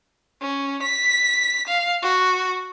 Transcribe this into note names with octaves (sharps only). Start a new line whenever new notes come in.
C#4
B6
F5
F#4